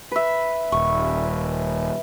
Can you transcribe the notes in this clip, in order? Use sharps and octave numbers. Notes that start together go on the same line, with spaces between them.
B4 E5
D#1 C#6